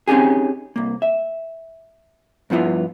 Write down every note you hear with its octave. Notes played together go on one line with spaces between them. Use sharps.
C4 C#4 D#4 G4 G#4
C2 A#3
E5
G2 F3 B3 E4 F4